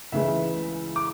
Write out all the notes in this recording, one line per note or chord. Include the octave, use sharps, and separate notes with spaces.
C#2 C#3 E3 G#3 E5
D6